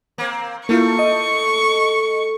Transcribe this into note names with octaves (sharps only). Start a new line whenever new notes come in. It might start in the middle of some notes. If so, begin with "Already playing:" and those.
A#3 C4
A3 A#3 E4 F4 C#6
D#5